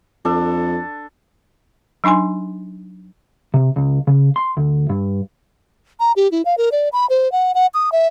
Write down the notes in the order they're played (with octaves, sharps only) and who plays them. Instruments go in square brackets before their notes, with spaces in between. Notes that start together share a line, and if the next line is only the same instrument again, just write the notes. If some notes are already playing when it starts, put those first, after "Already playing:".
[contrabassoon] F2 [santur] D4 A4
[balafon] F#3 D4 D#4 G#5 C6
[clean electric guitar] C3
C#2
C#3
C6
D2
G2
[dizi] A#5
G4
E4
F5
A#4
D5
B5
C5
F#5
F#5
D#6
E5